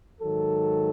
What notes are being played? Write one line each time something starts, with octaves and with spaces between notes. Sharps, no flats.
G#2 D#3 F#3 A4